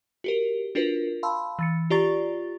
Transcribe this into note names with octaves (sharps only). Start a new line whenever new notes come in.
F#4 G4 A#4
D4 F4 F#4 A#4 B4
F5 A5 B5 C6 E6
E3 A6 C#7
F4 G4 D5 A#5 C#6 A6